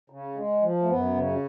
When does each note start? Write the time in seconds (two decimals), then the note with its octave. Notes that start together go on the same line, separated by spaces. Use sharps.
0.10 C#3
0.36 G#3
0.62 F3
0.82 A3
0.88 F#2 B3
1.15 C#3